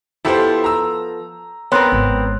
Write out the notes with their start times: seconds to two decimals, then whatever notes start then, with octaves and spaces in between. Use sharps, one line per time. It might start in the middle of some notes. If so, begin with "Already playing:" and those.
0.25 F3 B3 E4 G4 A4 C5
0.64 A#5 E6
1.72 B3 C4 A#4 C#5 C6 F#6
1.92 G#1